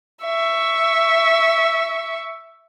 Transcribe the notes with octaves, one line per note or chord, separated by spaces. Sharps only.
E5 C#6